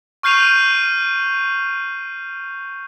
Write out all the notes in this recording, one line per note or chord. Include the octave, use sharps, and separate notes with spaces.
C#6 F6 G6 C7 D#7 F7